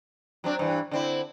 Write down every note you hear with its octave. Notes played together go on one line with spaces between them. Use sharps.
F#3 C4 D4
G2 E3
D3 C4 E4